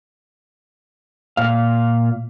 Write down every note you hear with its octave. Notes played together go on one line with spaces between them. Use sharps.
A#2 F5